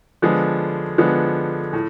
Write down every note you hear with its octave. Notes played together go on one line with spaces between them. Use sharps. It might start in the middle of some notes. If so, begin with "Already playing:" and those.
D3 F3 G#3 B3
D3 F3 G#3 B3
A2